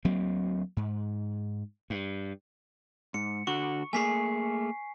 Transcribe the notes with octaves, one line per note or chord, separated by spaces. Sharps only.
D2 F#3 A#3 C4
G#2
G2
G#2 C#7
D3 F#4 C#6
A3 A#3 G#4 G#5 B6 C7